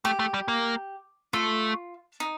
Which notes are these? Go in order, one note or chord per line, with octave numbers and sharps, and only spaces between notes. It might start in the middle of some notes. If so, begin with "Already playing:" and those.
A3 G4
A3
G3
A#3
A3 F4
D#4